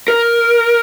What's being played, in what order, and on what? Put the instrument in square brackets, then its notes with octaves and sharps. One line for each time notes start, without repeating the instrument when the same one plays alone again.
[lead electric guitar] A#4